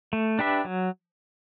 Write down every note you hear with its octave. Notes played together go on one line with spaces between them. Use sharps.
A3
D4 G4 B4 E5
F#3